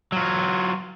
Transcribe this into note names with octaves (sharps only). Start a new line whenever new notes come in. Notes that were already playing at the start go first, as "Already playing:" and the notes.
F#3 F4